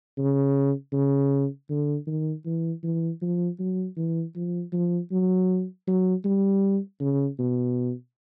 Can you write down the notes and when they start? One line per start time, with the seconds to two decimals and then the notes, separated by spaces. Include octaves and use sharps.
0.18 C#3
0.93 C#3
1.70 D3
2.07 D#3
2.45 E3
2.83 E3
3.22 F3
3.59 F#3
3.97 E3
4.36 F3
4.73 F3
5.12 F#3
5.87 F#3
6.25 G3
7.00 C#3
7.39 B2